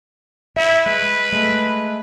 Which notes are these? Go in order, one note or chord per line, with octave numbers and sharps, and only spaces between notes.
E4 E5
G#3 B4
G#3 A3